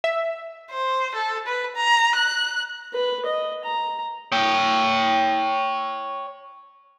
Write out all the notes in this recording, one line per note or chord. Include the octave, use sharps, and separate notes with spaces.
E5
C5
A4
B4
A#5
F#6
B4
D#5
A#5
C#5 G5